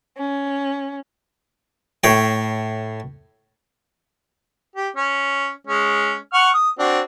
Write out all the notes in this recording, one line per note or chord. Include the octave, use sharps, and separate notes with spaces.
C#4
A2 C#5 G5
G4
C#4
G#3 C#4
F#5 C#6 F6
D#6
C4 D4 F#4